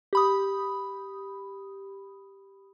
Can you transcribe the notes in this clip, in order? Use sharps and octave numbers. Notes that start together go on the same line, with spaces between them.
G4 B5 D#6